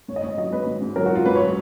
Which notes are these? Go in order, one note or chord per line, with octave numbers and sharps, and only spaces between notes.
G#2 C#5
D#5
G#2 C#5
F#3 D#5
G#2 B4
G#2
G#2
F#3 A#4
F#4
F#3 F4
G#2 B4
F#3 C#5